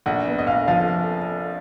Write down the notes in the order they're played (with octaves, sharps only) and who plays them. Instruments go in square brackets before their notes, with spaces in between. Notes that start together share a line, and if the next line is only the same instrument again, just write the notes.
[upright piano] A#1 F#5
B3
D#5
A#1 F5
F3 F5